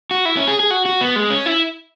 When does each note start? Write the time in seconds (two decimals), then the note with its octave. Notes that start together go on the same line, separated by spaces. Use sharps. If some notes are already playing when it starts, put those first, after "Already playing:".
0.11 F#4
0.25 E4
0.37 C#4
0.48 G#4
0.60 G#4
0.71 F#4
0.86 F#4
1.01 B3
1.16 G#3
1.30 C#4
1.46 E4